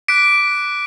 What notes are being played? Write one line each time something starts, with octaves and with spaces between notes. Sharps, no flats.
D6 F#6 B6 D7